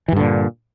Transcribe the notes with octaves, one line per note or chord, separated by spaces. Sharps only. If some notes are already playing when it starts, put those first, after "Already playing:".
G2 A#2 D3 E3